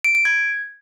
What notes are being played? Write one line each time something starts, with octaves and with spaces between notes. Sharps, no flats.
D7
D7
G#6